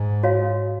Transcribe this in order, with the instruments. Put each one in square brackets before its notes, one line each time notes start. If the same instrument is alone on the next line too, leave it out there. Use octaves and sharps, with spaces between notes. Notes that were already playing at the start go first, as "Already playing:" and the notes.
Already playing: [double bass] G#2
[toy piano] F#4 C#5 F5